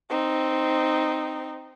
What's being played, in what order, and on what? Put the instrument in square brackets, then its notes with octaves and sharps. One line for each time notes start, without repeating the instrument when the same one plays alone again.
[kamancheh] C4 D#4